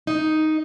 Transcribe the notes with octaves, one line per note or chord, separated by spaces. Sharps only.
D#4